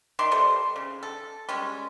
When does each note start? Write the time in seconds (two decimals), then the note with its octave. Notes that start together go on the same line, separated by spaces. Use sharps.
0.19 D#3 D5 E5 C6
0.31 E3 G3 A4 C5
0.76 C#3
1.03 A4
1.49 G3 G#3 C#4